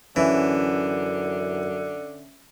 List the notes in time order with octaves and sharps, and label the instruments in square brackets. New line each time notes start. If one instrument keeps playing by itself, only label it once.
[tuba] F#2 [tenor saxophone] D3 [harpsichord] E3 [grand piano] C#4 E5